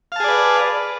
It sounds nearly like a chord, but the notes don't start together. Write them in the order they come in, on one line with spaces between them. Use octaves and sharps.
F5 A5 G#4 D5 B4